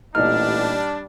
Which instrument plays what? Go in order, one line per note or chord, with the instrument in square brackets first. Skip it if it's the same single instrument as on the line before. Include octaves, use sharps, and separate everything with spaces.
[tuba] A1 [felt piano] A#2 D#4 [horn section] G3 D4 [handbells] F6